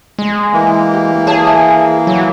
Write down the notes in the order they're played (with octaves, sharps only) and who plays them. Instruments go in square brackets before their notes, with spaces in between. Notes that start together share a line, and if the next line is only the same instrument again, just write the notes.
[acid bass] G#3
[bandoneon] E3 A#3
[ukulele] G4
[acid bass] G#4 [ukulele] C#5 A5
[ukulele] E5
[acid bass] F#3